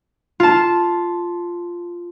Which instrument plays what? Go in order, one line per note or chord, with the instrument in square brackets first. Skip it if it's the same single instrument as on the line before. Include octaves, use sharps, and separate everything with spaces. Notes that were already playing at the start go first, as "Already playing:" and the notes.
[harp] F4 A5